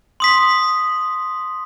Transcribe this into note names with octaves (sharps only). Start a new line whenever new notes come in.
C6 D#6 B6